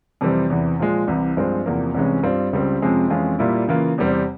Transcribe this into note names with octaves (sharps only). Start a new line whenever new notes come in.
F2 C3 E3 G3 C4
E2 C3 E3
A#2 F3 G#3
C2 C3 E3
G2 F3 G#3 C4
E2 C3 F3 A#3
C2 C3 E3 G#3 C#4
G2 G3 C4 F4
C#2 C#3 G3 C4
F2 C3 F3 G#3 C#4
F2 E3 G#3 C#4 F4
A#2 G3 A#3 E4
C#3 E3 A#3 F4
E2 C3 G3 C4